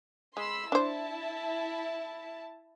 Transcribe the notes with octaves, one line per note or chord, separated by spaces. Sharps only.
G#3 B5 C6 E6
D4 E4 C5 A5